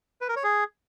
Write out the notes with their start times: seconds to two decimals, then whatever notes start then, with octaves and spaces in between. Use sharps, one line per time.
0.21 B4
0.29 A#4
0.36 C#5
0.44 G#4